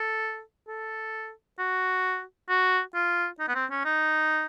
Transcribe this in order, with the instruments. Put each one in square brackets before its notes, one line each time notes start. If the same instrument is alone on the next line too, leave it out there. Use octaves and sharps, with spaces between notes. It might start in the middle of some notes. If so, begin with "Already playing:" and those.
Already playing: [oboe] A4
A4
F#4
F#4
F4
D#4
B3
C4
C#4
D#4